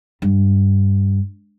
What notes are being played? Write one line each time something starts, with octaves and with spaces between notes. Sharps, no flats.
G2